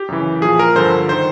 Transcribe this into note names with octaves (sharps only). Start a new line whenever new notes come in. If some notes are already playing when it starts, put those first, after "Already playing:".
Already playing: G4
F#2 C#3 E3
A#2 F3 G#4
A#4
G2 D3 F3 C5
D#3 C5